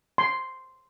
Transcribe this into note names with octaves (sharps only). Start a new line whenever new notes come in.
C6